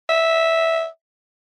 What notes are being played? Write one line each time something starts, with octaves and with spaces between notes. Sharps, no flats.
E5